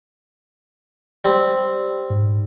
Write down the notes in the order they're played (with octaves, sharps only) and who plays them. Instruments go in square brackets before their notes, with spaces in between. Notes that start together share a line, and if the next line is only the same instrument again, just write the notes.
[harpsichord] G3 C4
[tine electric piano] G#2